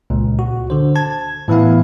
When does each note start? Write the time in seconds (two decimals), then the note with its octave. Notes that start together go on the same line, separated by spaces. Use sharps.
0.10 C#2 A#2
0.39 F#4
0.70 D3 C5
0.95 A5 G#6
1.48 A2 E3 B3 E4 F5